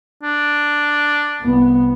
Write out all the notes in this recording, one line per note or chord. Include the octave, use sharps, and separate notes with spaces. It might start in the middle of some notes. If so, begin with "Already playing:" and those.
D4
C2 B3